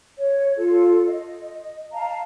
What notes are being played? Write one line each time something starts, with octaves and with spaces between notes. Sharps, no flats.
C#5
F4 A4
D#5
F5 A5 A#5